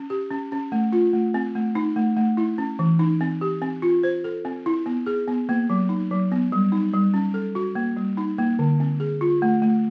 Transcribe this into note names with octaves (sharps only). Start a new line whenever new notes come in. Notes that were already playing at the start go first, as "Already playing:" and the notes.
Already playing: C#4
G4
C#4
C#4
A3
F4
A3
C4
A3
D#4
A3
A3
E4
C#4
E3
D#4
C4
G4
C4
F4
C5
A4
C4
E4
B3
G#4
B3
A#3
F#3
D#4
F#3
B3
G3
D#4
G3
C#4
A4
F#4
A#3
G3
D#4
A#3
D3
C4
G#4
F4
A3
A3